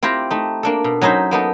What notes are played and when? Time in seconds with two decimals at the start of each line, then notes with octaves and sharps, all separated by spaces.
0.03 C4 E4 F4 G4 G5 A#5
0.31 A3 D#4
0.63 A#3 D4 A4
0.84 B2
1.01 F#3 C#4 D#4 E4 C5 E5
1.31 A#3 B3 D#4 A4